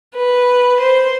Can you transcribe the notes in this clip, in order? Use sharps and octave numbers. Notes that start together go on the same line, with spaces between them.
B4
C5